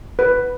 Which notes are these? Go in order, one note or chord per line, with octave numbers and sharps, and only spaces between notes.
B4